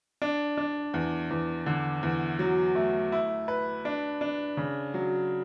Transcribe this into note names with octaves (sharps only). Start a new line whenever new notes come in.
D4
D4
E2
E2
D3
E2
F#3
A3
E4
B4
D4
D4
C#3
F#3